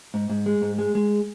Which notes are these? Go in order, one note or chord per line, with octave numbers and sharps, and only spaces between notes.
G#2
G#2
G#3
G#2
G#3
G#3